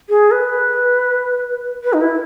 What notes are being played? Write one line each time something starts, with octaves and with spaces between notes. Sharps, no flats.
G#4
B4
B4
D#4
E4